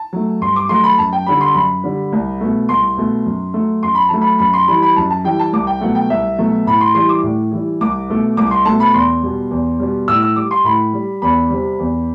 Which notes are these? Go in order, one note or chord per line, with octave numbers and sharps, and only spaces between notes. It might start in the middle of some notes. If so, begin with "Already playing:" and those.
Already playing: A5
F#3 A3
G2 C6
D6
F#3 A3 C6
B5
F#2 A5
G5
D3 G3 B5
C6
F#2 B5
D3 G3
C2
B2 A3
C2 C6
B2 A3
F#2
F#3 A3
F#2 C6
B5
F#3 A3 A5
B5
F#2 B5
C6
E3 G3 B5
B5
F#2 A5
A5
E3 G3 G5
A5
C2 D6
G5
B2 F#3 A3 F#5
G5
C2 E5
B2 F#3 A3
A2 B5
C6
E3 G3 C6
D6
A2
E3 G3
C2 D6
B2 A3
C2 D6
C6
A3 A5
B2
B5
E2 C6
B2 G3
E2
B2 G3
A2 E6
E6
G3 D6
C6
A2 B5
G3
E2 B5
C3 G3
E2